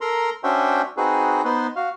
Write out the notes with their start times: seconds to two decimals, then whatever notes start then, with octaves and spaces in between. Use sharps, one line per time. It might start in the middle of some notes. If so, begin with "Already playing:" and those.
0.01 A4 A#4 A#5 C6
0.44 C#4 D4 F#4 C5 E5 G5
0.97 C4 D#4 F#4 G#4 B4
1.45 B3 D#4 B4 C5
1.76 F#4 F5